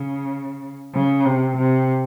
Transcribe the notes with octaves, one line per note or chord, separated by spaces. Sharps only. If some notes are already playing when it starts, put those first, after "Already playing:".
Already playing: C#3
C#3
C3
C3